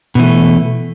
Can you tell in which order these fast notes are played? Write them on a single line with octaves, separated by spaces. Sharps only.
B2 E3 A3